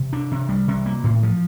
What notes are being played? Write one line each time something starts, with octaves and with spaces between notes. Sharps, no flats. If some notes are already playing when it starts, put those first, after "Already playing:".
Already playing: C3
D4
C3
G3
C3
A#3
A2
F3